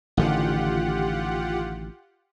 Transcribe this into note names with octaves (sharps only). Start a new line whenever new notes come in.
A1 D3 D#3 F4 G4 F#5